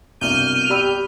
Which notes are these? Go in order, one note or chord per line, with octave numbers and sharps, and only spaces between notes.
C2 G2 B2 F6 G6 D#7
G4 D5 B5 E6